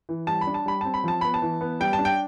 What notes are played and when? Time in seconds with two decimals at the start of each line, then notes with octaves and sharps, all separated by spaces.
0.09 E3
0.27 G3 A5
0.41 B5
0.47 D4
0.54 A5
0.66 G3 B5
0.81 C4 A5
0.94 B5
1.04 F3 A5
1.21 B3 B5
1.34 A5
1.42 E3
1.61 B3
1.80 G3 G5
1.93 A5
1.99 D4
2.05 G5